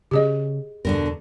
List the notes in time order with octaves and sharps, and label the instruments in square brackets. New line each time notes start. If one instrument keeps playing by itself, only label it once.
[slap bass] C#3 C#4 [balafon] G4 G#4 D#5
[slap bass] E2 [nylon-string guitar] B2 D3 A#4